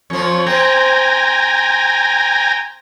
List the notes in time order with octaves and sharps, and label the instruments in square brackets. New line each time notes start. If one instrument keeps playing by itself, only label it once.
[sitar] F2 F3 [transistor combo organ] C#5
[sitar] C4 [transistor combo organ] G5 G#5 A#5